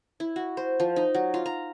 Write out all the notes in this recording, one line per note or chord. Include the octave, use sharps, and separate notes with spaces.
E4
F#4
C5
F3
D#4
F#3
F4
A#5